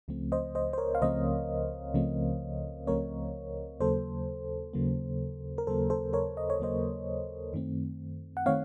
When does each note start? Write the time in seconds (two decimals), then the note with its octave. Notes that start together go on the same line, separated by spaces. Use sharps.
0.08 C#2 C#3 F3 A3 C4
0.32 C5 D#5
0.55 C5 D#5
0.73 C5
0.78 A#4 C#5
0.95 F5
1.02 C#2 C#3 F3 A3 C4 C5 D#5
1.94 C#2 C#3 F3 A3 C4
2.87 C#2 C#3 F3 A3 C4 A#4 C#5
3.80 D#2 C#3 F#3 A#3 A4 C5
4.73 D#2 C#3 F#3 A#3
5.58 A#4
5.67 D#2 C#3 F#3 A#3 A4 C5
5.90 A4 C5
6.13 A#4 C#5
6.37 D#5
6.50 C#5
6.60 D#2 C#3 F#3 A#3 C5 D#5
7.53 F#2 D#3 A3 C4
8.37 F#5
8.46 D#3 A3 C4 C#5 F5